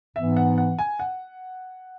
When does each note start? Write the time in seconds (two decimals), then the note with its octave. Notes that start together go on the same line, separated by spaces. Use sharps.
0.16 G#2 E3 B3 E5
0.37 F#5
0.58 F#5
0.79 G#5
0.99 F#5